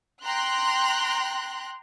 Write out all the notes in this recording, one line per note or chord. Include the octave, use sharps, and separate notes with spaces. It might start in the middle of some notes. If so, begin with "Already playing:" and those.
G5 A#5 C6 F#6